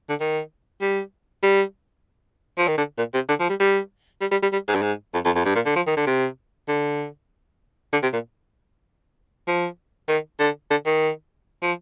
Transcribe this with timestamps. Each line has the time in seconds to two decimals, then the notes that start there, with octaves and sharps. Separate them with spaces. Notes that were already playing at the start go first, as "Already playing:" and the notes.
0.09 D3
0.20 D#3
0.81 G3
1.43 G3
2.58 F3
2.67 D#3
2.77 D3
2.98 A#2
3.14 C3
3.28 D3
3.39 F3
3.49 G3
3.60 G3
4.21 G3
4.31 G3
4.42 G3
4.52 G3
4.68 G#2
4.75 G2
4.82 G#2
5.13 F2
5.25 F2
5.35 F2
5.45 G2
5.55 A#2
5.65 D3
5.76 F3
5.87 D#3
5.97 D3
6.07 C3
6.68 D3
7.93 D3
8.02 C3
8.13 A#2
9.47 F3
10.08 D#3
10.39 D3
10.70 D3
10.86 D#3
11.62 F3